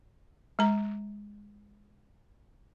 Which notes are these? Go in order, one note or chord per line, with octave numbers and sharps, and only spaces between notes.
G#3 A#5